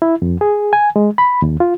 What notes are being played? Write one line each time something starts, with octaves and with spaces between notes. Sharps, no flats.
E4
F2
G#4
G#5
G#3
B5
D#2
F4